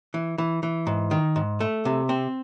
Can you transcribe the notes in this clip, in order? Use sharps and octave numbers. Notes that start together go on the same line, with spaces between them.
E3
E3
E3
G#2
D#3
G#2
A3
C3
C4